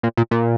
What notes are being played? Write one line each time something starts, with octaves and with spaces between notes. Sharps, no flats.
A#2
A#2
A#2